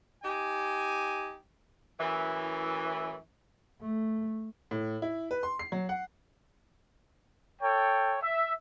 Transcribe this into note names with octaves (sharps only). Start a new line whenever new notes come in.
D#4 G4 G#5
F#2 A2 E3
A3
A2
E4
B4
C6
C7
F#3
F#5
A4 C#5 G5
E5